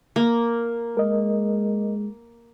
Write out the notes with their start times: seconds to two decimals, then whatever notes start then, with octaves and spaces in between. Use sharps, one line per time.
0.16 A#3
0.97 G#3 A#4 D#5